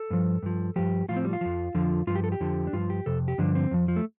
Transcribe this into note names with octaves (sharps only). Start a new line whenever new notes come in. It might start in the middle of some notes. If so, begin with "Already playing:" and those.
Already playing: A4
G2 F3
G2 F3
G2 F3 G4
A2 F3 F4
C4
G3
F4
F2 F3
F2 D3 F3
G2 F3 F4
G4
A4
G4
F2 D3 F3
D4
G2 F3 F4
G4
F2 C3 A4
G4
G2 D3 F3 D4
C4
F2 F3
F3
A3